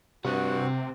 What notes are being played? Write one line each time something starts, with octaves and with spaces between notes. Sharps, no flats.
G2 C3 C4 F#4 F#5